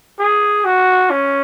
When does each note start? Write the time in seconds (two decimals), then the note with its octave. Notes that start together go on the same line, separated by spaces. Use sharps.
0.19 G#4
0.65 F#4
1.11 C#4